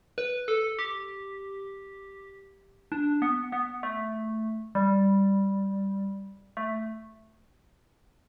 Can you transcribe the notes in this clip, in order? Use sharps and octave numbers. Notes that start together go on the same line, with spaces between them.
B4
A4
G4
D4
B3
B3
A3
G3
A3